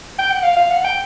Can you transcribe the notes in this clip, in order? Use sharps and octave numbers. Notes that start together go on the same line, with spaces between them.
G5
F#5
F5
F5
F#5
G5